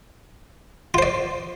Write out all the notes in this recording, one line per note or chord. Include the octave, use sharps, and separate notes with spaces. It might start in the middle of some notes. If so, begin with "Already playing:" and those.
F4 C5 D5